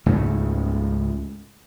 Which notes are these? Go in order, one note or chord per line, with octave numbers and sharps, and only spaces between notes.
C#2 G#2 C#3 A3